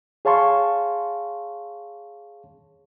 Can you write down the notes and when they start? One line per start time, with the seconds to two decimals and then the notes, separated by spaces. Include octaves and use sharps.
0.25 G#4 C#5 F5 A5 C6 C#6